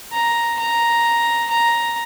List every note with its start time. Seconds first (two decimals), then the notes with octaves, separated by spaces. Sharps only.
0.13 A#5
0.59 A#5
1.50 A#5